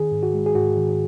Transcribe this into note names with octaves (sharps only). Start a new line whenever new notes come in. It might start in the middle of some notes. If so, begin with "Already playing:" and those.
Already playing: D#3 G#4
G#2
F#4
G#3
G#4
G#2 F#4
D#3